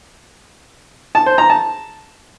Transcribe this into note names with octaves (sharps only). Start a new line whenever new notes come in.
A5
C5
A#5
A5